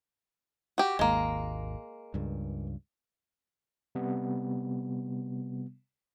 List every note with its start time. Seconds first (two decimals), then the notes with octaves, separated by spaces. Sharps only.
0.78 F#4 G4
0.99 G#1 D#2 G#3 A#3
2.14 C#2 G2
3.95 C3 G3 B3